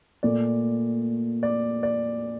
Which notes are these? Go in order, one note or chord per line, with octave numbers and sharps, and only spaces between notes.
A#2 A3 D5
D5
D5